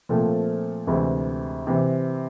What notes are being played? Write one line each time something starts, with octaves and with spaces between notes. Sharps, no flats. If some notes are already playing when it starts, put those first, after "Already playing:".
A#2 F3 A3 C4
D2 C3 E3 G#3
C3 E3